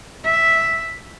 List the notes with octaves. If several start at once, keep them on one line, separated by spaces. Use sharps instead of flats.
E5